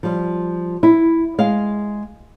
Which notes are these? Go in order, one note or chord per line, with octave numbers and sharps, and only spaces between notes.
F3 G3
E4
G#3 F5